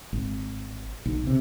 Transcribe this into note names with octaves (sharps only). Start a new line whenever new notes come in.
G#1
B1
C3